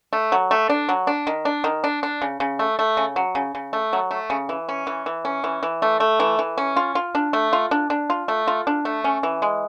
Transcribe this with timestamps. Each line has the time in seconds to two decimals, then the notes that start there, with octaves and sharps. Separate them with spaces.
0.13 A3
0.32 F#3
0.51 A3
0.70 D4
0.89 F#3
1.07 D4
1.27 D#3
1.45 D4
1.64 D#3
1.84 D4
2.03 D4
2.22 C#3
2.40 C#3
2.59 A3
2.79 A3
2.97 C#3
3.16 F#3
3.35 C#3
3.55 C#3
3.73 A3
3.93 F#3
4.11 A3
4.30 C#3
4.49 E3
4.69 C#4
4.87 E3
5.06 E3
5.25 C#4
5.44 E3
5.63 E3
5.82 A3
6.00 A3
6.20 E3
6.39 E3
6.58 C#4
6.76 F4
6.95 F4
7.15 D4
7.33 A3
7.53 F4
7.71 D4
7.90 D4
8.10 F4
8.28 A3
8.47 F4
8.67 D4
8.85 A3
9.04 C#4
9.23 E3
9.42 G#3